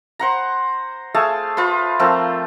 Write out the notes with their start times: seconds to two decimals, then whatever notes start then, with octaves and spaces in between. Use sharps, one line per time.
0.19 C5 F#5 A#5
1.15 A3 G#4 F5 A5
1.57 F4 B4 C5
1.99 F3 A3 C4 A#4